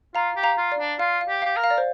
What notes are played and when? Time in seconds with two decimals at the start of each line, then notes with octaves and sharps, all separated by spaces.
0.15 F4 F5 A#5
0.36 G4
0.43 F5 A#5
0.57 F4
0.72 D5
0.79 D4
0.99 F4 F5
1.21 F5
1.28 G4
1.42 G4 F5
1.56 A#4
1.64 F5
1.70 D5
1.78 C5